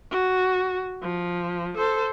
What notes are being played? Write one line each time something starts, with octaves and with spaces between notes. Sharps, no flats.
F#4
F3
A4 C5